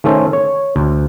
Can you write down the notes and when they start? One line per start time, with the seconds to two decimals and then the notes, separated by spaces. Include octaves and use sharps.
0.04 D#3 A3 C#4 A4 C5
0.33 C#5
0.76 D2